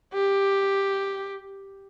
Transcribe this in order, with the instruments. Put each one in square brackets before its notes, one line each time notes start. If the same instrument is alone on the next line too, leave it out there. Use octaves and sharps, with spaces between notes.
[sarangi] G4